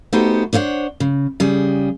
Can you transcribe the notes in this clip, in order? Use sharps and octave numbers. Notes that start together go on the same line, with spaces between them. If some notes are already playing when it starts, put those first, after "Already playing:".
A3 B3 D#4 F#4 G4 C5
D4 C5 C#5 F5 F#5
C#3
C#3 G3 G#4